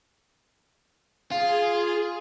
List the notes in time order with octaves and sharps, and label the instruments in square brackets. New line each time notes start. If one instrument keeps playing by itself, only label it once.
[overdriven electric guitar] F4 [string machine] G#4